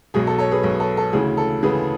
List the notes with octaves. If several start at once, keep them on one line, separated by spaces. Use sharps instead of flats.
B1 B2 G#4
A4
A4 C#5
G#4 B4
B1 B2
A4
A4
D2 C#3 E3 G#4
A4
D2 C#3 E3 G#4 B4